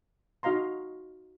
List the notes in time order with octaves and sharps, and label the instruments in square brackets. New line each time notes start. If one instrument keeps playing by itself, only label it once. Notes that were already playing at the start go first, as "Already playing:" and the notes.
[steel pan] D#4 F#4 D#5 F5 A#5 C6